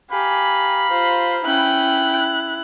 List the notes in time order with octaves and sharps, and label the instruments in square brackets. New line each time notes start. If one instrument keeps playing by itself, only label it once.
[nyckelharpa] G4 [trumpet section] F5 A#5 B5 [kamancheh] G#5
[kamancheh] F4 [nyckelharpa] C5
[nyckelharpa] C#4 G5 [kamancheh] E4 F#6